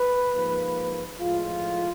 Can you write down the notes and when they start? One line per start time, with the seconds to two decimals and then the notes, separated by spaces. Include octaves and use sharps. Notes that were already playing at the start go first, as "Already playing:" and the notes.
Already playing: B4
0.33 G#2 F3 A#3
1.19 A2 F3 G#3 F4